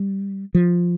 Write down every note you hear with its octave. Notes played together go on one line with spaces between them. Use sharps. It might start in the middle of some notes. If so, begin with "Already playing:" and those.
Already playing: G3
F3